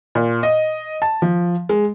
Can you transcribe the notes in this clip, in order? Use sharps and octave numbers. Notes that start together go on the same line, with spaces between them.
A#2
D#5
A5
F3
G#3